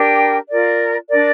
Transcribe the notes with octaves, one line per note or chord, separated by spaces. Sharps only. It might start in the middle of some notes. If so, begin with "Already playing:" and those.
Already playing: D4 G4 A#4 G5
F4 A#4 D5
D4 A#4 D5